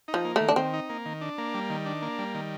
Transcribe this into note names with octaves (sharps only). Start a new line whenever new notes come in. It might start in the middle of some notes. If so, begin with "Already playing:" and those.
D#4
F3
A#3
D#3 A3
D4
D#3 C4
D#4
A#3
D#3
D4
A#3
G3
D#3
D4
A#3
G3
D#3